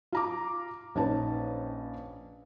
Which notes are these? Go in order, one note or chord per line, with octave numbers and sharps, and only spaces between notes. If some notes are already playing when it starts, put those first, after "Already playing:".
F4 A#5 D6
A#1 C#4 D#4 B4 A5